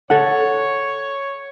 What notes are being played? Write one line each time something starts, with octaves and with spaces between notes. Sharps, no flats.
A4 C#5 F#5